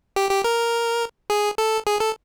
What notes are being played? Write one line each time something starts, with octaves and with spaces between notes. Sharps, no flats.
G4
G4
A#4
G#4
A4
G#4
A4